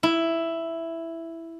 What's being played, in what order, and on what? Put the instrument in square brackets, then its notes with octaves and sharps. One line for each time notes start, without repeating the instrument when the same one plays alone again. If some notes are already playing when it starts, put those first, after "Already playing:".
[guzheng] E4